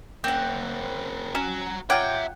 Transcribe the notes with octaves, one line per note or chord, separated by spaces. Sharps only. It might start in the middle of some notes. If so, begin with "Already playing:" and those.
A#3 C4 C#4 F#5 G6
C#4 F#4 A#5 E7
F4 C#5 E5 F#5 G5 A#5 D6 G#6